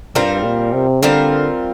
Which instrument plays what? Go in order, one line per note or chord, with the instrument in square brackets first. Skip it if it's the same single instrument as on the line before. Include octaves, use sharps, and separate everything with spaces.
[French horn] G2 [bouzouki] G3 C4 F4 A#4
[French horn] A#2
C3
[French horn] D3 [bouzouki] G3 C4 F4 A#4